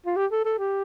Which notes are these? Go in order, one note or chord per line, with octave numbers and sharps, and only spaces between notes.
F4
G4
A4
A4
G4